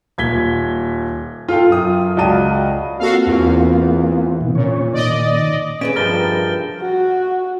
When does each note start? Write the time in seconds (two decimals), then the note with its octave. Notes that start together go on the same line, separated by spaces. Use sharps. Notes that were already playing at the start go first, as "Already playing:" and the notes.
0.18 D#1 G#6 B6 G7
1.48 F4 A4 F5 G5
1.69 F#2 F4 D#6
2.17 C#2 F#4 D5 G5 A5 D#7
2.99 A#3 C4 F4 F#4 A4 F5
3.26 E2
4.41 B2 D#3 E3
4.55 A#2 C#4 C#5
4.94 A#2 D#3 D5 D#5
5.81 C#4 G#4 B4 E5 D7
5.96 G2 F3 A#4 G5 A5 F6 A6 G7
6.81 F#4